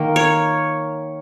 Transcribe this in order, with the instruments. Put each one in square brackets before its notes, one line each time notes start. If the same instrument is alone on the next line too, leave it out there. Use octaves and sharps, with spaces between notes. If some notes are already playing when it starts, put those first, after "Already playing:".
Already playing: [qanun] D#3 A#3
C#5